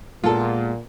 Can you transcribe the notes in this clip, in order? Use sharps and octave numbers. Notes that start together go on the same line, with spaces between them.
A#2 G#3 A#3 B3 F4 A4